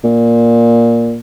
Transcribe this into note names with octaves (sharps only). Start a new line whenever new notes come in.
A#2